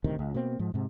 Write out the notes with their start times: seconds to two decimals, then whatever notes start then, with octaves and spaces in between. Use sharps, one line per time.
0.04 D#1 D2 C3 D#3
0.19 C#2
0.34 B2 A#3 C4
0.59 G#2 F3
0.74 G#2 C3